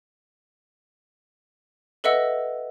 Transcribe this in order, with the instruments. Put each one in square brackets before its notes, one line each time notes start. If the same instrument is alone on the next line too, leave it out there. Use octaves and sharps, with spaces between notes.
[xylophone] A4 B4 D#5 E5 F#5 E6